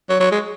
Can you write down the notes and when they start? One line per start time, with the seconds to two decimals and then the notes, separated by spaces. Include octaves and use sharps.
0.09 F#3
0.20 F#3
0.31 G#3